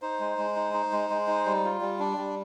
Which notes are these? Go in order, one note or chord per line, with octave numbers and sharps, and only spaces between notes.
D#4 C5
G#3
G#3
D#4
D#4
G#3
G#3
D#4
G3
F4
G3
D4
G3